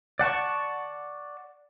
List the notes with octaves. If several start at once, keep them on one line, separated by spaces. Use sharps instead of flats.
D5 F#5 A5 C#6